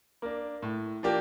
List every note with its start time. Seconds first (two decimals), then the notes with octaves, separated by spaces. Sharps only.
0.22 A#3 D4
0.62 A2
1.03 F3 A#3 D4 G4